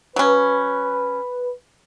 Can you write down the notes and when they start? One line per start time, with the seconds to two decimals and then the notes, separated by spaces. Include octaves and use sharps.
0.16 F#3 C#4 B4